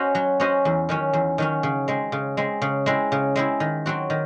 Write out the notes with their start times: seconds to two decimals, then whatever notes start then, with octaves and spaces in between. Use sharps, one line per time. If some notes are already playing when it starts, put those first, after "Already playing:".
Already playing: C#4 F#4 C5 D#5
0.15 F#3
0.40 C#4 F#4 C5 D#5
0.65 E2
0.89 D#3 F#3 C#4
1.13 E2
1.38 D#3 F#3 C#4
1.63 C#3
1.88 G#3 C4
2.12 C#3
2.37 G#3 C4
2.62 C#3
2.86 G#3 C4 E4
3.12 C#3
3.36 G#3 C4 E4
3.60 D#3
3.86 F#3 C4 F#4
4.10 D#3